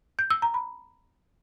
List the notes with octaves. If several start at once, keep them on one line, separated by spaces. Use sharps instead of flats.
G6
E6
A#5
B5